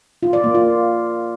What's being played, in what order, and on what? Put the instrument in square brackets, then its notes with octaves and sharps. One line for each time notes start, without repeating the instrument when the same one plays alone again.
[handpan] F4
D5
A#3
F4